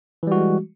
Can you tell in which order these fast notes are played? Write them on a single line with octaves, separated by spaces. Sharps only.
E3 G3 F#4 G#3